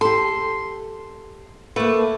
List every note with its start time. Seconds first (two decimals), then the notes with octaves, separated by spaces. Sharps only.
0.01 G4 A4 C6
1.76 A3 A#3 B4